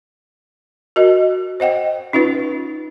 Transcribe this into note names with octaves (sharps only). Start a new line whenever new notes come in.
F#4 A#4 D#5
C5 D#5 F#5 G5
C#4 D#4 F4 B4